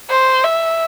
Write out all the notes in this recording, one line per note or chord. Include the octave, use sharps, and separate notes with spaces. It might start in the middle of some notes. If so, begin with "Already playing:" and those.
C5
E5